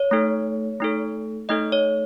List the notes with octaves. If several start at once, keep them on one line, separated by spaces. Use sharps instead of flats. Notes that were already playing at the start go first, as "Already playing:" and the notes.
Already playing: C#5
A3 D#4 A4
A3 D#4 A4
A3 D#4 A4 D#5
C#5